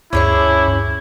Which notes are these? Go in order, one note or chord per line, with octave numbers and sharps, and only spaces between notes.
D2 G2 C#4 E4 G#4 C#5